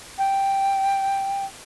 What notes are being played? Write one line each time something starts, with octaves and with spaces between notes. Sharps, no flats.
G5